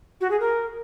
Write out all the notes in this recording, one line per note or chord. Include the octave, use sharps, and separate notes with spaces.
F#4
G#4
A#4